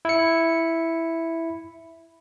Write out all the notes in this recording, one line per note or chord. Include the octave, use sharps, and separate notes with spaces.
E4 C#7